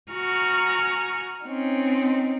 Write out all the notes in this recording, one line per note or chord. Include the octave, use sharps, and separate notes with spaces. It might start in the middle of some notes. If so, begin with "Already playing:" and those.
F#4 G#5 A#5 C#6 F6
C4 C#4 D#4